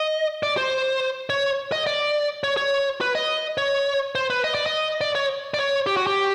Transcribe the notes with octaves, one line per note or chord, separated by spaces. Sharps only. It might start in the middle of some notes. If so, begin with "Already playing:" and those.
Already playing: D#5
D5
C5
C#5
D#5
D5
C#5
C#5
B4
D#5
C#5
C5
B4
D#5
D5
D#5
D5
C#5
D5
C#5
G4
F#4
G4